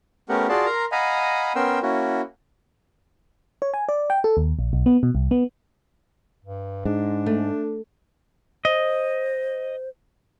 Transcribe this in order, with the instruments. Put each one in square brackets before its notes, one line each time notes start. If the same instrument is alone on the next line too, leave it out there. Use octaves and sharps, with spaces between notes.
[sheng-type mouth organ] A3 B3 C#4 G4 A#4 F#5
F4 F#4 G#4 D5 A5 C6
A#4 A#5 C6
D#5 F5 F#5 G#5 A#5 B5
B3 C#4 A#4 G5 C6 E6
A#3 C#4 E4 F#4
[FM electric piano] C#5
G#5
D5
G5
A4
D#2
A#1
B1
B3
B2
C2
B3
[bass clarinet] G2
[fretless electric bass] G#2 [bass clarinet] D4
[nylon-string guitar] A3
[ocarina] C5 [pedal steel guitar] D#5